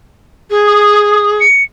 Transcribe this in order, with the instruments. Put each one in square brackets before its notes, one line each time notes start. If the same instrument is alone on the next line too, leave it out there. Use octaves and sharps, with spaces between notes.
[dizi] G#4
[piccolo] D#6
C#7